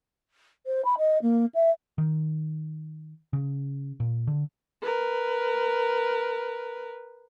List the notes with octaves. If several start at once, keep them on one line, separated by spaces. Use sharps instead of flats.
C5
B5
D#5
A#3
E5
D#3
C#3
A#2
D3
A#4 B4